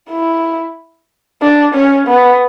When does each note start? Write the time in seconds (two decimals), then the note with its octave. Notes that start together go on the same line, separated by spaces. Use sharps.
0.11 E4
1.42 D4
1.75 C#4
2.08 B3